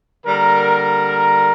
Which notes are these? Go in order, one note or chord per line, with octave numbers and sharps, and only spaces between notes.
D3 G3 A#3 A#4